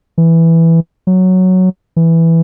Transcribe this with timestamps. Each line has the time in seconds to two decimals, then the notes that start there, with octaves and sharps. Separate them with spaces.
0.18 E3
1.07 F#3
1.96 E3